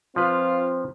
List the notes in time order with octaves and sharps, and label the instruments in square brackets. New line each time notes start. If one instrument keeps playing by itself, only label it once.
[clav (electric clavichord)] F3 B4 [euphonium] C4 [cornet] F4